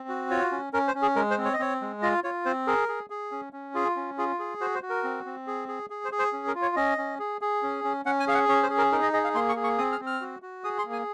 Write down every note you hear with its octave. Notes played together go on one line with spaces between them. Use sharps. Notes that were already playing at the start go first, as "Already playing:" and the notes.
Already playing: C4
F#4
F4 C#5
C#4
C#4 A#4
C5
C#4
G#4
G#3 A#4
C5
C4
C#5
D#5
C4 C#5
G#3
F4 D#5
F4 C#5
C4 C5
G#4 A#4
G#4
G#4
C#4
C#4
F4 G#4
C#4
F4 G#4
G#4
F#4 C5
C5
F#4
A#4
C4
C4
G#4
G#4
G#4
C5
G#4
C5
C#4
A#4
F4
C#5
C#4 D#5
C#4
G#4
G#4
C#4
C#4
C#4 F#5
G#5
G#4 F5
F#5
C#4 C#5
C5
G#4
A#4
D#4 A#4
D#5
G#4 D#5
F5
A#3 C6
C#6
G#4
C#6
C4 D#6
F6
C4
F6
F#4
F#4
G#4 D#6
C6
A#3
G#5